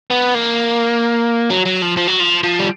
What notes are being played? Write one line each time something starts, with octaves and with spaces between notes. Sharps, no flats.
B3
A#3
F#3
F#3
F3
F3
F#3
F3
F3
G3